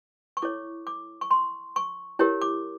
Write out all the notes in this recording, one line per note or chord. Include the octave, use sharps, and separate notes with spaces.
C#6
E4 A4 C#5 D6
D6
C#6
C6
C#6
E4 G4 A#4 C#5
D6